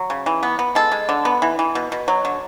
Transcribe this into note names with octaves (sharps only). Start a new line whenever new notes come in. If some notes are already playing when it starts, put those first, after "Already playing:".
Already playing: F#3
C#3
E3
B3
B3
G#3 A4
G#3
D3
B3
E3
E3
B2
B2
F#3
D3